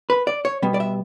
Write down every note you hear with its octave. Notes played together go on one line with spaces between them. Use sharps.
B4
D5
C#5
B2 G3 B3
D5
E5